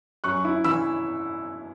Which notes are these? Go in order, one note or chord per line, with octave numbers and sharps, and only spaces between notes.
F#2 C#6 F#6
E4
E3 B5 E6